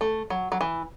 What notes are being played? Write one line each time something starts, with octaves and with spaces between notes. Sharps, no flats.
A3
F#3
F#3
E3